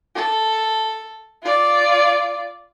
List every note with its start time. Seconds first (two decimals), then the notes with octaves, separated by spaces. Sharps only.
0.15 A4
1.43 F4 D5